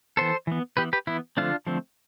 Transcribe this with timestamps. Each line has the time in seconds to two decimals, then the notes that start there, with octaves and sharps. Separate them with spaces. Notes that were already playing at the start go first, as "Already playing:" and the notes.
0.17 E3 B3 A4 C5
0.47 E3 B3
0.77 E3 B3 G4 B4
0.93 G4 B4
1.07 E3 B3 E4
1.37 D3 F3 A3 C4 D4 F4
1.67 D3 F3 A3 C4